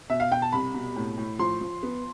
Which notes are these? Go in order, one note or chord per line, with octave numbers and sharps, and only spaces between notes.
B2 E5
F5
B2 G5
A5
C2 B5
B2
A2
A2
F3 C6
F3
B3